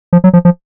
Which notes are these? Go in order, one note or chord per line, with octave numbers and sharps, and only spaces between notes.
F3
F#3
F3
F3